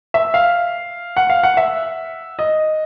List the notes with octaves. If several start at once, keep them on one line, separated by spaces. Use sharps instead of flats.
E5
F5
F#5
F5
F#5
E5
D#5